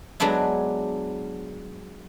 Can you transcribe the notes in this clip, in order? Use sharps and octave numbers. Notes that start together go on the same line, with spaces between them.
F#3 G#3 B3 D4 E5